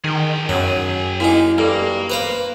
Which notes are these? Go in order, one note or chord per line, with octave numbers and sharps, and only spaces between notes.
D#3 G#4 G5
F#2 F#3
A#3 D#4 E4 G#5
G2 A#3 A4
B4 C5 F5